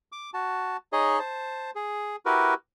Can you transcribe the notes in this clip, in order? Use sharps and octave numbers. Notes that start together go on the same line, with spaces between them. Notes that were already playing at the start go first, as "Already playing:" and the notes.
D6
F#4 A5
D#4 G#4 C#5 D#5
C5 A5
G#4
E4 F#4 G4 A#4 B4